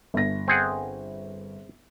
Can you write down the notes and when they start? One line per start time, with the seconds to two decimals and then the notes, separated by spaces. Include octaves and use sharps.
0.14 G1 A#6
0.48 C4 G#4 F#5